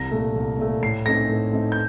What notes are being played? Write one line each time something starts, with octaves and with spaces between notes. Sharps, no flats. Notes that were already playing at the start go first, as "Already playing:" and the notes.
Already playing: C2 A#6
A#2 A3
C2
A#2 A3
A2 C7
A3 C4 D#4 A#6
A2
A3 C4 D#4
G6